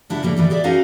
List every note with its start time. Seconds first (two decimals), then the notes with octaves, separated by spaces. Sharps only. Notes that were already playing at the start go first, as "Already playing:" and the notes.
0.09 C#3 D4 E4 G4 F#5
0.23 C#3 F3 G3 A#3
0.37 D#3 E3 G3 D5
0.50 G4 G#4 D5 E5
0.64 C#4 D#4 F#4 A#4 F5 F#5